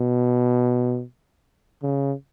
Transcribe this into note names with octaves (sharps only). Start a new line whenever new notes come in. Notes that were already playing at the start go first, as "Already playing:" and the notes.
Already playing: B2
C#3